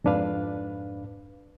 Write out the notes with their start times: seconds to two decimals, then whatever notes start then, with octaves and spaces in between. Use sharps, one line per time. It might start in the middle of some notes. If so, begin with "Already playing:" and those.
0.04 F2 G#2 D4 B4 F5